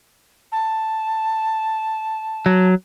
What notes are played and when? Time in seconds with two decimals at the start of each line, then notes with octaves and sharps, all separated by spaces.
0.52 A5
2.46 F#3